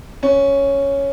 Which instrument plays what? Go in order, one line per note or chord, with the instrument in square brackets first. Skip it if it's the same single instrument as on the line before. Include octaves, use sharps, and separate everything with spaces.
[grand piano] C#4